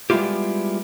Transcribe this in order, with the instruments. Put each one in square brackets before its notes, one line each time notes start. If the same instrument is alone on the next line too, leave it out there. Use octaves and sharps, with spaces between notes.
[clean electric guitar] G3 G#3 B3 E4 F4 G4